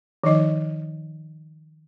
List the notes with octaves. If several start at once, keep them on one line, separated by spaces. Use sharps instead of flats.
D#3 F3 D#4 D#5